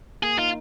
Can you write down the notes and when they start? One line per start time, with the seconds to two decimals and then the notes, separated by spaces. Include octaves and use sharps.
0.23 A#3 G#4
0.38 D#4 F4